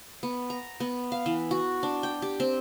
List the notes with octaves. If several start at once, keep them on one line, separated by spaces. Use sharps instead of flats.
B3
A#5
B3
F5
E3
F#4
D4
G5
G4
C4